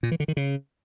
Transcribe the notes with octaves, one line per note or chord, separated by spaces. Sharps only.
A#2
E3
D3
D#3
C#3